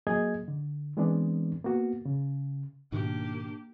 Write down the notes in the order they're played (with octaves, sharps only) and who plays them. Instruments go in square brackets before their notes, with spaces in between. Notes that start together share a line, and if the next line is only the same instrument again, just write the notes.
[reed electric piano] F#3 A#3 G#4 D#5 G#6
D3
E3 G#3 B3 C4 D4
A#3 B3 F#4
C#3
[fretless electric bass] G#2 B2 D#3 [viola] A#3 G4 [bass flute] D4